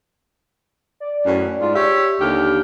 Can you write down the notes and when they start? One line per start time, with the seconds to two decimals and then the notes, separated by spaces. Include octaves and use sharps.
1.00 D5
1.26 F#2 A2
1.61 G#2 F4
1.75 G4 C#5 E5
2.20 D#2 D3 G4 F6